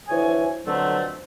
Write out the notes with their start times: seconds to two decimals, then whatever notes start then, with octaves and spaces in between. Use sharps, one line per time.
0.08 D2 E3 F3 C#5 G#5
0.66 B2 D3 F3 F#3 A3 C4